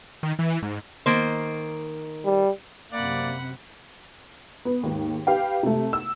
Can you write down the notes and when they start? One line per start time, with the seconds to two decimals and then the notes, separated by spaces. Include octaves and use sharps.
0.23 D#3
0.39 E3
0.62 G#2
1.06 D#3 A#3 C5
2.25 G3
2.92 F#2 C3 A#3 D5 F#5 B5
4.65 B3
4.83 D#2 G#2
5.27 G4 B4 F5 G5
5.63 C3 A3
5.93 E6